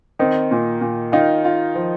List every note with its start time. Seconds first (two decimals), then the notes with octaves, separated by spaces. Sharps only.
0.19 D#3 C4 D#4
0.51 A#2
0.81 A#2
1.12 D#3 D#4 F4
1.44 F4
1.75 F3